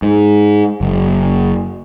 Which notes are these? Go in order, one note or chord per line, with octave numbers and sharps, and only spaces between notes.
G#2
F#1